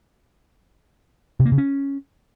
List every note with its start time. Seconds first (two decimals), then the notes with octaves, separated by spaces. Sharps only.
1.39 C3
1.46 A#3
1.52 C#3
1.58 C#4